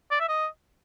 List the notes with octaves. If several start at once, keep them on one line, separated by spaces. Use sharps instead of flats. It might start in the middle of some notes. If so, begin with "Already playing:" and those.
D5
E5
D#5